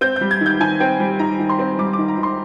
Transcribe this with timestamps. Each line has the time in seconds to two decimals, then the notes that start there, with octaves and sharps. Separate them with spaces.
0.01 C4 G6
0.16 G3 G6
0.31 G#6
0.41 D#3 G6
0.60 D#3 G#5
0.80 C4 G5
1.00 G3
1.19 D#3 A#5
1.39 D#3
1.49 C6
1.59 C4
1.79 G3 D6
1.93 D6
1.98 D#3
2.08 A#5
2.18 D#3
2.23 C6